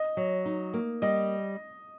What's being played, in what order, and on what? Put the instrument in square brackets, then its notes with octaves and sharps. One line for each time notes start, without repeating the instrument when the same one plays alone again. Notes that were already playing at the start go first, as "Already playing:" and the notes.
Already playing: [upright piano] D#5
[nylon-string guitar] F#3
D#4
A#3
[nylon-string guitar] G3 [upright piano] D#5